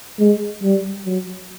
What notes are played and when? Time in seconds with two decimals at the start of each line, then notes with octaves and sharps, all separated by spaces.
0.19 G#3
0.63 G3
1.06 F#3